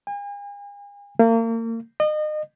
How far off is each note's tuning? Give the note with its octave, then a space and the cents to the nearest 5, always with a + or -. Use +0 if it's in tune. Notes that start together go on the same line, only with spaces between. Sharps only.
G#5 -40
A#3 -35
D#5 -35